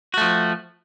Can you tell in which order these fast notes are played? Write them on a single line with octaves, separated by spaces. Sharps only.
F#4 A3 F3